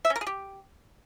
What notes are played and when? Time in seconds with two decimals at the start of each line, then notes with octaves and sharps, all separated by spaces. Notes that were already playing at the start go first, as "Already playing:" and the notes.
0.05 E5
0.10 C#4
0.16 A#4
0.21 G#4
0.27 G4